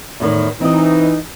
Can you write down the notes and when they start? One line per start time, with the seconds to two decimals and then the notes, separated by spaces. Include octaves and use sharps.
0.20 E2 A2 D#3
0.61 E3 C4 D#4 D#5